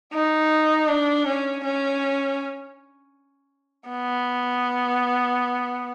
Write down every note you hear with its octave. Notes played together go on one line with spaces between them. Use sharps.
D#4
D4
C#4
C#4
B3